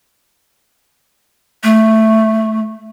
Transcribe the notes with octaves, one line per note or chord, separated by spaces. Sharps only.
A3